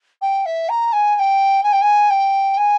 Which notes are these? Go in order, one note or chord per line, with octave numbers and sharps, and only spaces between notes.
G5
E5
A#5
G#5
G#5
G5
G#5
G5
G#5
G5
G#5